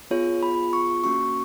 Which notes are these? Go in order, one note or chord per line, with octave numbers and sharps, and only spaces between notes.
B3 F4 G#4 C#5
B5
C#6
A#3 C#4 F#4 C#6